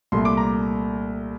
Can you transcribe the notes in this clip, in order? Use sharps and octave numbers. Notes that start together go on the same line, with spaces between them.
C2 A#2 A3 C6
D6
A#5